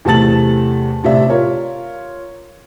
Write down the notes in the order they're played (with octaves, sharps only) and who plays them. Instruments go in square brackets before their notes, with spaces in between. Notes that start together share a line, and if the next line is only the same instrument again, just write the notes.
[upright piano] E2 C3 A3 A5 A6 F#7
A2 C3 D5 E5
F4 A#4 C#5